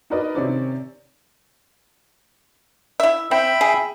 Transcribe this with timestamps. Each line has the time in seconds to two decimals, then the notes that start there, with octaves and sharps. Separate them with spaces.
0.10 D#4 F#4 A#4 B4 D5 D#5
0.35 C3 D#3 C4 C#4 D5
3.00 E4 E5
3.31 C4 E5 G5 B5
3.61 G#4